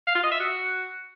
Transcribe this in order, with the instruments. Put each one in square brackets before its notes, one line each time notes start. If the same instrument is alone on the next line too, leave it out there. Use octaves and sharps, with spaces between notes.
[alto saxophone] F5
F4
D#5
E5
F#4